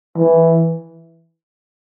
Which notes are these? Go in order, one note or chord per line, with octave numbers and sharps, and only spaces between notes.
E3